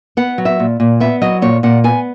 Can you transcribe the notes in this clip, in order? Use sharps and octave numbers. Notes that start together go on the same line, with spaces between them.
B3 F#5
F#3
E5
A#2
A#2
B3 E5
F#3 D#5
A#2 C#5
A#2 F#5
B3 G#5